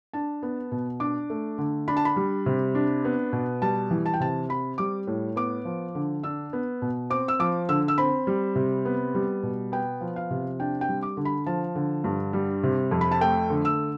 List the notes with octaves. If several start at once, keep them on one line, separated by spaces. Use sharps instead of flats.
D4 A5
B3
B2
D4 D6
A3
D3
D4 B5
A5
B5
G3
C3
D4
B3
B2
G3 A5
E3
A5
G5
C3 A5
C4 B5
G3 D6
A2
B3 D6
F3
D3
D4 E6
B3
B2
C4 D6
E6
F3 D6
D3 E6
E6
C4 B5
G3
C3
B3
G3
B2
B3 G5
F3
F5
C3
D4 G5
G5
G3
D6
D3
B5
F3 A5
D3
G2
G3
C3
F2
B5
A5
A3 G5
D3
E6